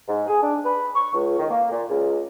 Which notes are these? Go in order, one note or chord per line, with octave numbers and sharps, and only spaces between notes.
G#2
G#4
D4
B4
C#6
C#2
D#3
A#3
A#2
C#2